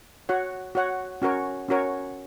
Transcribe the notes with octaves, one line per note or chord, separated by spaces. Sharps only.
F#4 C#5 F#5
F#4 C#5 F#5
C#4 F#4 A#4 C#5
C#4 F#4 A#4 C#5